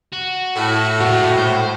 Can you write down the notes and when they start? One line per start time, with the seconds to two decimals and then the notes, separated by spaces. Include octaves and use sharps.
0.13 F#4
0.56 A2
1.00 A#2 G#3 F#4
1.38 C5